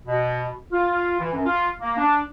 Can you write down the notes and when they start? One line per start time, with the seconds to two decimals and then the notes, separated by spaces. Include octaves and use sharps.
0.06 B2
0.72 F4
1.20 E3
1.33 F#2
1.46 F4
1.80 A#3
1.97 D4